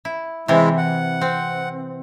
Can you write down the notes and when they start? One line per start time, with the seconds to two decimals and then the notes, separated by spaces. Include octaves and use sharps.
0.05 E4
0.48 C3 E3 G#3 E4
0.77 F#5
1.21 C4